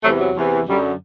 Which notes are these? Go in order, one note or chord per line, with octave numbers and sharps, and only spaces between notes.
E2 C3 E3 F#3 A3
F#3
E2 C3 E3
F#2 D3 F#3 G3